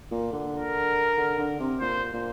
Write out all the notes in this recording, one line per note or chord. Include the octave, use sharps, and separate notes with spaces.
A#2
D3
A#4
D3
D3
C3
A#2 C5
A#2